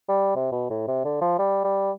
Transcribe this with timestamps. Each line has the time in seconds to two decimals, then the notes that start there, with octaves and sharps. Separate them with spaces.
0.09 G3
0.36 C3
0.52 B2
0.70 A2
0.88 C3
1.05 D3
1.21 F3
1.39 G3
1.64 G3